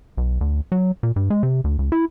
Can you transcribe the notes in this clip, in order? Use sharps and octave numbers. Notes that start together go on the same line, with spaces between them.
B1
D2
F#3
A#2
G2
G#3
C3
D2
C#2
E4